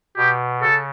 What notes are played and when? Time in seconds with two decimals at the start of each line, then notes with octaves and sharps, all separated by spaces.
0.17 B2 G4
0.61 C#3 A4